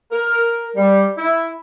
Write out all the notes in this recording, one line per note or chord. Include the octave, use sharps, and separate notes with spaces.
A#4
G3
E4